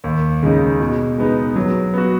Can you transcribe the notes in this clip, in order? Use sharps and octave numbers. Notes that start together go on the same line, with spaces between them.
D#2
C#3 G#3 D#4
B2
G#3 B3 D#4
F#3
B3 F#4